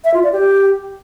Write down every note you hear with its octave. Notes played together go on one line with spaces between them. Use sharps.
E5
F4
D5
G4